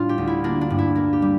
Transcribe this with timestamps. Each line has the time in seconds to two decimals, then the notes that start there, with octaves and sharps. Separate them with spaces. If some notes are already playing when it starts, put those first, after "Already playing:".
Already playing: A2 G3 D4 F4
0.09 G4
0.18 D2
0.27 E4
0.44 A#3 D4
0.61 D4
0.70 G2
0.79 E4
0.95 A#3
1.13 G4
1.22 G3